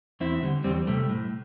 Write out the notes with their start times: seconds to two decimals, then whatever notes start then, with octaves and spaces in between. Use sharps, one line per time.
0.20 E2 C4 E4
0.43 D3 G3
0.64 E2 G3 C4
0.87 C3 G3 A3
1.09 A2